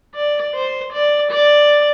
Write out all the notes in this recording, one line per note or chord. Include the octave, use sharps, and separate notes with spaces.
D5
C5
D5
D5